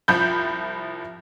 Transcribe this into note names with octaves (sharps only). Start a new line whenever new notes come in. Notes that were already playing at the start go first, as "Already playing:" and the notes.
C2 F3 B5 G6